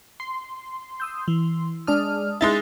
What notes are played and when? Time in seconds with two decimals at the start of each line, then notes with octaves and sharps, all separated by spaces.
0.20 C6
1.00 D#6 E6 G6
1.28 E3
1.87 G#3 D4 D5 A5 D#6 F6
2.41 G#3 D#4 E4 A6